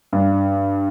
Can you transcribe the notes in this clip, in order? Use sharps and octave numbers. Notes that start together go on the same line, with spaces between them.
G2 D4